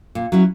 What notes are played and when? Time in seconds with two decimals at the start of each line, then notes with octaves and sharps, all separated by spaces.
0.15 A#2
0.32 F#3 C#4 E4